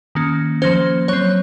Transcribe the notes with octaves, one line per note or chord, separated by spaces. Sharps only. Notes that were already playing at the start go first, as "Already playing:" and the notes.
D#3 A#3 C#4
F3 A#3 C#4 C5
F#3 C4 C#5